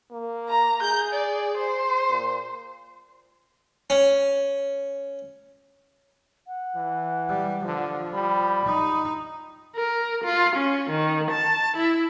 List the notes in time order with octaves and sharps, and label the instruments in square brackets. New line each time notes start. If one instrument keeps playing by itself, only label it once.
[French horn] A#3
[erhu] A#5
[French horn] G#4 [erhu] G6
[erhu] D5
C5
[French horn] A#2
[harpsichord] C#4
[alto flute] F#5
[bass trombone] E3
[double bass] G3
[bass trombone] D3 [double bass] F3
[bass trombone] G3 [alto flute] B5
[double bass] D#4
[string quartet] A#4
F4
C#4
D#3
A5
E4